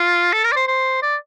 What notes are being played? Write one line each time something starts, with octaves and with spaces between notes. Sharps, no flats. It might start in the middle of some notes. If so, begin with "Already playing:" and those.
Already playing: F4
A4
A#4
D5
C5
C5
D5